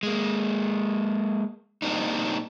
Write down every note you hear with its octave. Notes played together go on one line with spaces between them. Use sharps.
G#3 A#3
G3 A#3 C4 D4 D#4